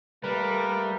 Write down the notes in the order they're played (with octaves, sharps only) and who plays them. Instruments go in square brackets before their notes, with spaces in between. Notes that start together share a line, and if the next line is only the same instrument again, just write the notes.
[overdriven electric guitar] G3 [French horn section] A3 A#3 [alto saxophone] A#4 [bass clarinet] B4